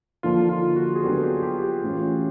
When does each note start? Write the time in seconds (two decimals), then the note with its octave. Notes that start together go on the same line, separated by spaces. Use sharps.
0.23 D3 F3 A#3 D#4 F4
0.49 F4
0.76 F#4
0.96 G#4
1.03 F#3 B3 D4 F#4 G4 A4
1.23 G4
1.43 G4
1.63 G4
1.83 A2 E3 A3 C#4 F4